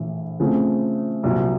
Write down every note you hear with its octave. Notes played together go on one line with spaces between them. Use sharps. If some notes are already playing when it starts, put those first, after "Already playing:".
Already playing: A#1 A2 E3
C#3 F3 A3 C4
C2 A#2 F#3